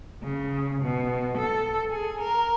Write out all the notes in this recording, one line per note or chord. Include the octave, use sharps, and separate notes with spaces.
C#3
B2
A4
G#4
A#4